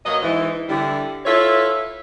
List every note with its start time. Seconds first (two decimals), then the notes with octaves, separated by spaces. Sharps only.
0.05 B2 F#3 A#3 D#5
0.22 G#2 E3
0.68 D3 G3 E4
1.26 E4 F4 A4 B4 C#5 E5